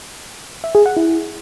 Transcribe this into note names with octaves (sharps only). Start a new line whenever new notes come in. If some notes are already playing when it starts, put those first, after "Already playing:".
E5
G#4
F#5
E4